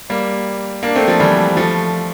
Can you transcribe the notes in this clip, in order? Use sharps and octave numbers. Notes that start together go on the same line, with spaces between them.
G3 A#3
A#3 D4
A3 C4
F3 A3
E3 G3
F3 A3